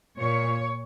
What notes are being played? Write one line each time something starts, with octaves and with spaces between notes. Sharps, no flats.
A#2 C#5